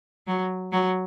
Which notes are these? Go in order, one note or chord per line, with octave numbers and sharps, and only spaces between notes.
F#3
F#3